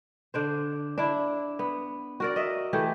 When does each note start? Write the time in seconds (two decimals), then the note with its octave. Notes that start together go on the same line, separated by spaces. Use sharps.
0.34 D3 D4 C5
0.98 D4 E4
1.59 B3
2.20 F#4 A#4 D5
2.36 D#5 E5
2.73 E3 A3 G4